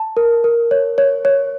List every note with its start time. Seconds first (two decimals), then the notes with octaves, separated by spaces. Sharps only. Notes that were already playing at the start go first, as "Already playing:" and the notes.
Already playing: A5
0.17 A#4
0.44 A#4
0.71 C#5
0.98 C#5
1.25 C#5